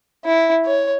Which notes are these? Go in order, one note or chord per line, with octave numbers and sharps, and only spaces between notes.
E4
C#5